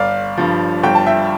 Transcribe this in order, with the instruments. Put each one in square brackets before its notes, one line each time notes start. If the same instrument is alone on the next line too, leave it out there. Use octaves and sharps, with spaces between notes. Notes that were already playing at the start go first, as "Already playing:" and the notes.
Already playing: [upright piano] G1 D5 F5
G2 F3
G1 G5
A5
E5 G5